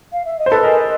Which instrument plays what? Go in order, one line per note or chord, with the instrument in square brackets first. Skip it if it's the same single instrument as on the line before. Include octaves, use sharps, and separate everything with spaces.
[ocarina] F5
E5
D#5
[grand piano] C5
A4 B4
G#4 A#4